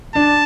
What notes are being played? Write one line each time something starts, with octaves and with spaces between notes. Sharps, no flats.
D4 A5